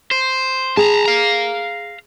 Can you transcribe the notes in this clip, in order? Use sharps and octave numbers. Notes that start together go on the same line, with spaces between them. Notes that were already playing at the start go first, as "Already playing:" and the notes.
C5
G#4 A5 A#5
F5 A#5